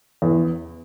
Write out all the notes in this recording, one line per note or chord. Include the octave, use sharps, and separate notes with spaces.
E2